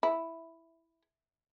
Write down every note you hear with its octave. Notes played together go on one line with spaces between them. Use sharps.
E4